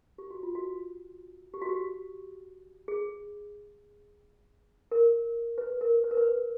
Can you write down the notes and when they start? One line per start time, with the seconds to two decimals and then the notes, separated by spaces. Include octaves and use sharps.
0.18 G4
0.30 F#4
0.43 F4
0.55 F#4
1.54 G4
1.62 F#4
1.69 G4
2.88 G#4
4.91 A#4
5.58 B4
5.81 A#4
6.04 B4
6.11 A#4
6.17 B4